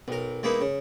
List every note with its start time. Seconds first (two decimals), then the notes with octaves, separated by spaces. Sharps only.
0.08 B1 A#4
0.43 G#3 A#3 B3 D#4 E4
0.61 C#3